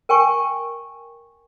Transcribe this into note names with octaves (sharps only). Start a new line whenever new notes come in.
A#4 G5 G#5 C#6